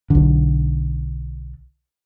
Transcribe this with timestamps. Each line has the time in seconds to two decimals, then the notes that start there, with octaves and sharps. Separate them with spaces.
0.10 B1 D3